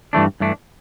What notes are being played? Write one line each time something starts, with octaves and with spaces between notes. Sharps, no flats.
G2 E3 A3 D4
G2 E3 A3 D4